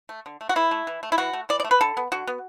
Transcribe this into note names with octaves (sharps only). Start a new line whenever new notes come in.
A3
D3
A3
F#4
E3 E4
A3
E3
A3
E4
E3 F#4
A3
E3 D5
D5
A3
B4
D3 A4
B3
D3 F#4
B3